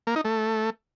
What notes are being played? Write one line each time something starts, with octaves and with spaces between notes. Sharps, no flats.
A#3
D#4
A3